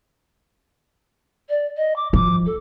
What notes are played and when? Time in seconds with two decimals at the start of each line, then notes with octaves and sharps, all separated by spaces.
1.49 D5
1.76 D#5
1.95 D6
2.13 F3 D6
2.45 A4